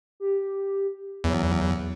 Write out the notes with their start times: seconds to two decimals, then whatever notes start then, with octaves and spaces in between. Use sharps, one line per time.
0.20 G4
1.24 E2 F#3